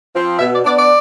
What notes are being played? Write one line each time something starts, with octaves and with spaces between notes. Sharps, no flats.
F3 C4
B2 E5
D5
B3 D4 D5
D5